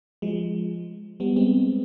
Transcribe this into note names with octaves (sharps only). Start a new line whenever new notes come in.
F3 G#3
G3 B3
G#3 C4